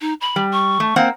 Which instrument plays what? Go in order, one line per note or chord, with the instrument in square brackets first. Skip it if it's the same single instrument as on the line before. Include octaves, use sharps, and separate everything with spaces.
[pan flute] D#4
B5
[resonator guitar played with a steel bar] G3
[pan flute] C#6
[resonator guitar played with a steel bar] A3
A#3 C4 F#5